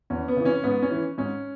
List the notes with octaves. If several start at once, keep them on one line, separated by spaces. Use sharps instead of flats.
E2 C#4
B3
C#3 E3
C#4
G#2 B3
C#4
E3
G#2 C#4